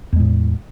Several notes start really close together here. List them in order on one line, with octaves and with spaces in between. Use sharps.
E2 G#3 A2